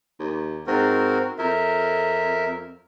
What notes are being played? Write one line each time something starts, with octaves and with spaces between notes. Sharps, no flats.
D#2
G#2 C4 F#4 A#4
F2 A#4 E5